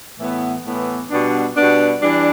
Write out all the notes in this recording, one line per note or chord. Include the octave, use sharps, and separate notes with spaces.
A2 E3 B3
A2 E3 B3
B2 G3 B3 D4
B2 G3 B3 D4
E3 G3 D4